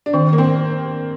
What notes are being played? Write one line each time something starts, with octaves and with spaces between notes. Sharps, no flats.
D4
D#3 C4
A#3
C4